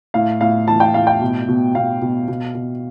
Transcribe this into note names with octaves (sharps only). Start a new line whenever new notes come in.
A2 F5
A2 F5
E3 A5
G5
A2 F5
G5
B2
B2
B2 F5
B2
B2
B2